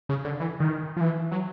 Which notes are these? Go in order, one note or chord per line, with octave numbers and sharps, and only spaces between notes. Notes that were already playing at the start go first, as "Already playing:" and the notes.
C#3
D3
E3
D#3
F3
E3
F#3